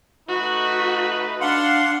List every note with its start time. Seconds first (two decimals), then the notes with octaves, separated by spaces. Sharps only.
0.29 A3 D#4 F#4 B4
1.41 D4 F5 F#5 C6